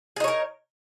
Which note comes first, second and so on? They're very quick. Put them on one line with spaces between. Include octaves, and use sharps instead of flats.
G#4 D#4 C#5 A#4